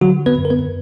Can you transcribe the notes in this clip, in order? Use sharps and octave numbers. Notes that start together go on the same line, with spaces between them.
D3 F#3 F#4
B3 B4
F#2
A#4
B3 B4